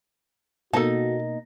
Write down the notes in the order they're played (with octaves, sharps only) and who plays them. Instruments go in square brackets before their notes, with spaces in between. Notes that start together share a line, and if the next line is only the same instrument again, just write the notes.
[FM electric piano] B2 A#3 [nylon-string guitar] D#4 [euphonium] F#4 [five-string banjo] A4 A5